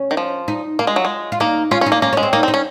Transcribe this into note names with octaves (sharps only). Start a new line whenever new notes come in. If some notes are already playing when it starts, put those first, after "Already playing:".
Already playing: C#4
D#3
F3
D#4
A#3 F4
G#3
F#3
G#3
F4
A#3 D#4
C#4 F4
C#4
D#4
A#3
A#3 C#4
C#4
G#3
C4
A#3 D#4
C4
D#4
C#4